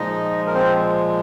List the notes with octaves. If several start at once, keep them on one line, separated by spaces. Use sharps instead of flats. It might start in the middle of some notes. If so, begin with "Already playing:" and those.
Already playing: A#2 F3 G#3 D#4 D#5
A#4
C4 C5